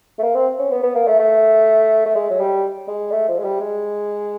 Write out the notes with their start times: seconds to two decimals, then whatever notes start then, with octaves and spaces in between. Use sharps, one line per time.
0.18 A3
0.23 A#3
0.35 C4
0.59 C#4
0.71 B3
0.83 B3
0.95 A#3
1.07 A3
1.19 A3
2.06 A3
2.15 G#3
2.30 F#3
2.40 G3
2.88 G#3
3.12 A3
3.28 F3
3.39 G#3
3.44 G3
3.60 G#3